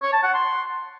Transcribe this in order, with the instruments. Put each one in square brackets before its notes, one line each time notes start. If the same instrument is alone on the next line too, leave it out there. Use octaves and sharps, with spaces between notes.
[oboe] C#5
A5
F#5
C6